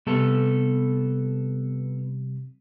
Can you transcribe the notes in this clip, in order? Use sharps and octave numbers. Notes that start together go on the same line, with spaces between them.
C3 G3 B3 A4